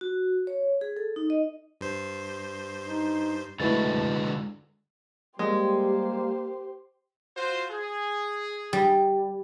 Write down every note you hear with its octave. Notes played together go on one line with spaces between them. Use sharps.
F#4
C#5
G#4
A4
D#4
D#5
G2 C5
D#4
D3 G#3 A3 E4 F#4 B4 A6
G3 G#3 A#3 G4 C5
F4 F#4 C5
G#4
G3